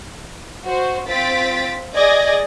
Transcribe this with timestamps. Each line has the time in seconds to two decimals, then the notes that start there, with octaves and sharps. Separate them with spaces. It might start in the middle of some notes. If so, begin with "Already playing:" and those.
0.65 F#4 C5
1.06 C4 F4 A6 B6 D7
1.95 G#4 D5 D#5 G#5 G#6 A#6